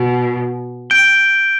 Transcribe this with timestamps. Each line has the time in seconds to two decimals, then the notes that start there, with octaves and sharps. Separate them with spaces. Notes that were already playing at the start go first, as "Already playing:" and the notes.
Already playing: B2
0.90 G6 D7 G7